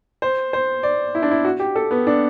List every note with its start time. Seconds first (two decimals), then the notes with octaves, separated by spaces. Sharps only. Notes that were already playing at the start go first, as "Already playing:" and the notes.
0.22 C5
0.53 C5
0.83 D5
1.15 E4
1.23 D4
1.31 E4
1.45 F#4
1.60 G4
1.76 A4
1.91 B3
2.07 D4